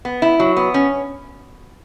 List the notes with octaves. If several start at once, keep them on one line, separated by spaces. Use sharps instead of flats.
B3
E4
F#3
B3
C#4